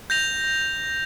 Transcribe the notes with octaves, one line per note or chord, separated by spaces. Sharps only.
G6 A#6 F7